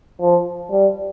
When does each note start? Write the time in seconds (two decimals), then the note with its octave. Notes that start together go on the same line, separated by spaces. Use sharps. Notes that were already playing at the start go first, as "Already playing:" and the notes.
0.21 F3
0.71 G3